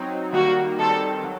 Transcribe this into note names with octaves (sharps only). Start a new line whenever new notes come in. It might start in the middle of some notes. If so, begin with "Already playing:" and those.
Already playing: F#3 C4 D#4
D#3 G3 A#3 F#4
D#3 G3 C4 A4
F#3